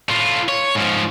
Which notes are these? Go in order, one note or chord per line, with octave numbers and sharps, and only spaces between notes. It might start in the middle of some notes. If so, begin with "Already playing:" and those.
A2 F4
C#5
G#2 F3